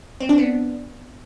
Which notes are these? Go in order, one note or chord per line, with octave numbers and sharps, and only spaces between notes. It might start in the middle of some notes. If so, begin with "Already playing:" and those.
C4
D4
B3